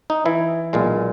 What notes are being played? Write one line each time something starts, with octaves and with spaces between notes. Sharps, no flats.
D#4
E3 E4
B1 A#2 G#3